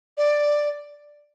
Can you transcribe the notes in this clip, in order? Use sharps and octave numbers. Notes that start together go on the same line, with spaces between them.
D5